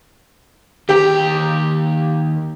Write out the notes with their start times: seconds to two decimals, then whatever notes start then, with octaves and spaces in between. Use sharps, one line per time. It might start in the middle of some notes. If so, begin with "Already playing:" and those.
0.89 D#2 G4 G5 A#5